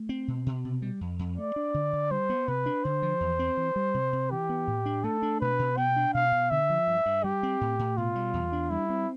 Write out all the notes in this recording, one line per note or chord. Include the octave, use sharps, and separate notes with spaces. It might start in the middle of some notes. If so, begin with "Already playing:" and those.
Already playing: A3
C4
B2
B2
C3
G3
F2
F2
A3 D5
D4
D3
D3
G3 C5
B3
C3 B4
D4
D3 C5
F3
E2
C4
E3
G3
C3
C3
E3 G4
B3
A2
D4
A3 A4
D4
B2 B4
B2
B3 G5
D4
B2 F5
B2
D3 E5
F3
G2
G2
G3 G4
C4
A2
A2
B2 F4
G3
E2
D4
G3 E4
C4